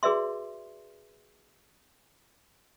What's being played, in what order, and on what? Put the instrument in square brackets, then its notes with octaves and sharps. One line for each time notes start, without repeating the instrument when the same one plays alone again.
[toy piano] F#4 G#4 B4 D5 E5 C6